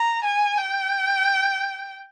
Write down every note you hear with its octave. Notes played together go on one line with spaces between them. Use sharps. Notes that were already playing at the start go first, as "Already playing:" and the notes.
Already playing: A#5
G#5
G5